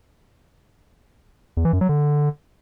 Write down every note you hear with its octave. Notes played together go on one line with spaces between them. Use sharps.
E2
E3
F#2
F#3
D3